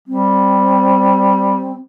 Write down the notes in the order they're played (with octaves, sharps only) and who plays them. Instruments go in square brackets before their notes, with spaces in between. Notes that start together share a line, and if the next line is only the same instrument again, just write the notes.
[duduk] G3 [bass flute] C4